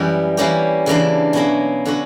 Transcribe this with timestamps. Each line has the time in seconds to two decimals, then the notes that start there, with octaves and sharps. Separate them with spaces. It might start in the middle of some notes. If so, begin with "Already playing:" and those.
Already playing: F#2 E3 G3
0.37 E3 G3 A#3 C#4 G4
0.86 C#3 E3 A#3 D4
1.33 B2 F#3 A#3 C#4
1.85 D3 F#3 C#4 F#4